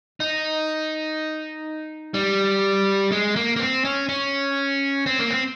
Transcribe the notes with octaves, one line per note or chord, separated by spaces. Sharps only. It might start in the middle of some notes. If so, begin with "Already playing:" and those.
D#4
G3
G#3
A#3
A#3
C4
C#4
C#4
C4
A#3
C4